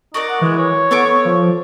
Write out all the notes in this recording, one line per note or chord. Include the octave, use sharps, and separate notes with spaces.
D#4 F#4 A#4 D5
F#5
E3 G#3
C#5
B3 A4 C#6 D6
F3